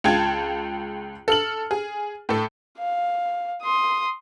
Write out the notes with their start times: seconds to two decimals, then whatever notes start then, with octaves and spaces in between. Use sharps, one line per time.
0.04 C#2 F4 G5 A5 G#6
1.28 A4 F6 F#7
1.71 G#4
2.29 A2 A4
2.79 F5
3.63 C6 D#6